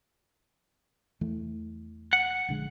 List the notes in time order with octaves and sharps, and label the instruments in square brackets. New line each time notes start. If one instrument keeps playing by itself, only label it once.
[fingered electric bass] E2 E3 A3
[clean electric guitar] F#5
[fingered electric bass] A#1 D3 G#3